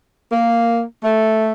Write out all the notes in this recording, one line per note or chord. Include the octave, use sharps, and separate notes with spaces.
A#3
A3